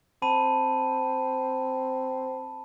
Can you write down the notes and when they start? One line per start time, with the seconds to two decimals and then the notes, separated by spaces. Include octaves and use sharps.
0.22 C4 A5 B5 D#7